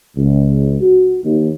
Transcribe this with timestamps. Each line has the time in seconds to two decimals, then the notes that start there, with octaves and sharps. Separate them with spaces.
0.16 C#2
0.81 F#4
1.24 D#2